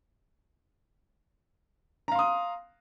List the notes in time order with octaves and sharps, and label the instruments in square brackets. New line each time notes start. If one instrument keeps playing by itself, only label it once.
[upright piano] A#5
F5
C6
D#6